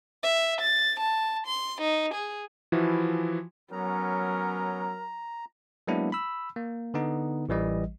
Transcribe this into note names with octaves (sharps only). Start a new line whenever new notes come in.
E5
A6
A5
C6
D#4
G#4
E3 F3 E4 F#4
F#3 B3 C#4 A#4 A#5
F#3 G#3 A#3 B3 D4 E4
B5 E6
A#3
D3 B3 D#4
A1 E3 G3 D#5